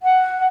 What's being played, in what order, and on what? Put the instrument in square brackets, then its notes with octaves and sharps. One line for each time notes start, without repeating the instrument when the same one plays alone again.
[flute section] F#5